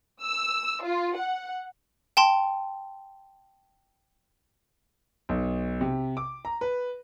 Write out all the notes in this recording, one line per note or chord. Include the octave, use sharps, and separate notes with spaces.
E6
F4
F#5
G5 A5 C6
B1
C3
D6
A#5
B4